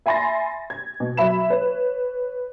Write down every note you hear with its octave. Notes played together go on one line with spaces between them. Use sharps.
E5 G#5 B5 C6 A6 A#6
G#6
B2
F#3 E5 B5 E7
B4 C#5